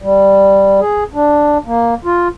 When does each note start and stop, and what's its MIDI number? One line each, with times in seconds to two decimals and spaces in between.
0.02 0.80 55
0.81 1.04 68
1.14 1.58 62
1.66 1.95 58
2.05 2.28 65